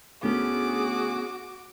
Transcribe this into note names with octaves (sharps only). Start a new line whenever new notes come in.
D2 B3 C#4 F#4 G#4 A4 D6